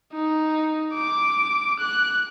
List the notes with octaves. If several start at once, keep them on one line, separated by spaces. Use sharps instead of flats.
D#4
D6
F#6